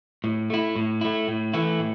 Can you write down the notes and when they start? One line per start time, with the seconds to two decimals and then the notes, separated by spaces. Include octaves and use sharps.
0.24 A2
0.50 A3 E4
0.76 A2
1.01 A3 E4
1.28 A2
1.54 E3 A3 E4
1.79 A2